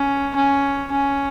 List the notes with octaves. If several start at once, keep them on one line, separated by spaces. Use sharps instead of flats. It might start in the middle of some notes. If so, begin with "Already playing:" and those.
Already playing: C#4
C#4
C#4